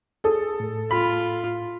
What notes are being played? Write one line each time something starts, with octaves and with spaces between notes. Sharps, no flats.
G#4 A4 D#6
A2
F4 B5